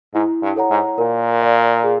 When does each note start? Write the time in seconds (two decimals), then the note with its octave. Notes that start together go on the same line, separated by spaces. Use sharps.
0.14 G#2 E4
0.42 G2
0.56 A4 C#5 F#5 A#5
0.70 G#2
0.98 A#2 A#4
1.41 D5 F5
1.84 G#4